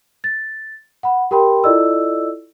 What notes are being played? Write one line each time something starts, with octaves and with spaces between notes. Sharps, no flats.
A6
F#5 B5
G4 A#4 G5 B5 C6
E4 F4 A4 D5 D#5 E6